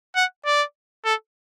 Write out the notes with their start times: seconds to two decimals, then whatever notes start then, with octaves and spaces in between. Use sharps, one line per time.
0.16 F#5
0.46 D5
1.05 A4